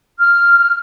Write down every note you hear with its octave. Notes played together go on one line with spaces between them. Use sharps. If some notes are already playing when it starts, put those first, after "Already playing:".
F6